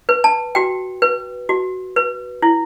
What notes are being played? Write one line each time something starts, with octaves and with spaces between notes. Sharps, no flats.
B4
A5
F#4 G5
B4
F#4
B4
E4